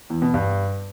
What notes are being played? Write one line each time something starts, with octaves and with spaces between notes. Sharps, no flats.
E2
B2
G2